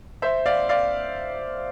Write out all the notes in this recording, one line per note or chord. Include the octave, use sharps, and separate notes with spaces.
C5 E5
D5 F5
D5 F5